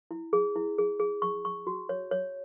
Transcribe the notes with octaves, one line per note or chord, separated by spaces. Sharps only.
E4
G#4
E4
G#4
G#4
C#6
C#6
F#4
C#5
C#5